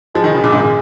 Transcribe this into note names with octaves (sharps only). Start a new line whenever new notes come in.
F3 G#3
D#3
C#3
A#2
G#2